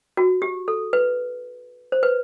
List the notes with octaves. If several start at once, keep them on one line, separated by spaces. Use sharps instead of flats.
F#4
G4
A4
B4
C5
B4